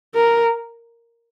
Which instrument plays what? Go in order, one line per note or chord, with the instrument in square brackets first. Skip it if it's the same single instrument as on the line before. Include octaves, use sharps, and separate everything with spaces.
[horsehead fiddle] A#4